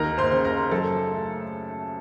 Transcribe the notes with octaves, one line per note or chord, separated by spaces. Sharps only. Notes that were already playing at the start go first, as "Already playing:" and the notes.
Already playing: D#2 A#4 A#5
C5 C6
C#3
A#4 A#5
F#2 A4 A5
A3